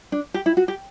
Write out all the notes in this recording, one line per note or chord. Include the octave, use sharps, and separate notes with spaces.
D4
G4
E4
F#4
G4